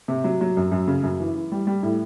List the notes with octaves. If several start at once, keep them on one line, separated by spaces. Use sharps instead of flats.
C3
F#3
F#3
F#2
F#2
C#3
F#2
E3
E3
G3
G3
A2